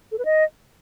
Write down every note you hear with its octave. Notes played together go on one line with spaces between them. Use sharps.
A4
B4
D#5